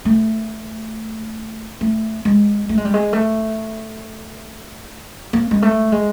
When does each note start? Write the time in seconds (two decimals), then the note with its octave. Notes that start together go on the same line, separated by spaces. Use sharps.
0.05 A3
1.81 A3
2.25 G#3
2.69 A3
2.77 G#3
2.85 G3
2.94 G#3
3.13 A3
5.33 A#3
5.51 G#3
5.62 A3
5.92 G#3